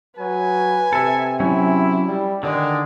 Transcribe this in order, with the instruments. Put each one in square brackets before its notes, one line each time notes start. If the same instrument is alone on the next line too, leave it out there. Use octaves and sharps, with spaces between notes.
[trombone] F#3 [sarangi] B4 [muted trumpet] G#5
[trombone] C3 [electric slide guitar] A4 E5
[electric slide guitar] F#3 C#4 [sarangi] E4
[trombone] G3
[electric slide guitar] D3 [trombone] D#3 [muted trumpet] G#3 [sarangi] D5